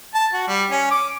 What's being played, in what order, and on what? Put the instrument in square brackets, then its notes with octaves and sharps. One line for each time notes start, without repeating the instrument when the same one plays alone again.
[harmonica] A5
F#4
G3
C#4
D6